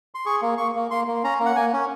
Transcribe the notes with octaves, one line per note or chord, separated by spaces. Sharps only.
C6
G#4 C#6
A#3
A#3 C#6
A#3
A#3 C6
A#3
C#4 A#5
A#3
F#5
A#3 G#5
C#4